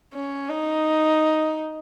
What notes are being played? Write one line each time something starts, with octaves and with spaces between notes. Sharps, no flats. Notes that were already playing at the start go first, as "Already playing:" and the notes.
C#4
D#4